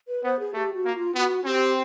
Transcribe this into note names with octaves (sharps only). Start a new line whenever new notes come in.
B4
B3 C5
G#4
A3 G4
F#4
A#3
F4
B3 F#4
C4 G4